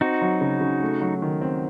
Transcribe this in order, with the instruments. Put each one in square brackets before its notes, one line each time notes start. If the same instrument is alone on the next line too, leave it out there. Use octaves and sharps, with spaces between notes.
[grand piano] C4 [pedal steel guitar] D#4 F#4
[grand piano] F#3
C#3
C#3
A3
F#3
D#3
C4